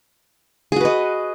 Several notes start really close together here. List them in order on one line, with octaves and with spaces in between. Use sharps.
G#4 F#4 B4 D#5